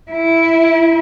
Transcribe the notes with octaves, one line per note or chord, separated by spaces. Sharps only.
E4